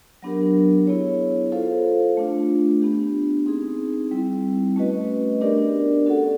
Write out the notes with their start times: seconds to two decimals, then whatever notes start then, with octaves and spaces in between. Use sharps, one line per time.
0.22 F#3 B3 D4 G4 A#4
0.87 B3 E4 G#4 C#5
1.52 F4 A4 C5 F5
2.17 A3 D4 F4
2.82 B3 D4 G4
3.46 C4 D#4 G#4
4.11 G3 C4 E4
4.76 A3 C#4 F#4 B4 D#5
5.41 B3 D4 G4 A#4 D5
6.06 C#4 F#4 A4 D5 F#5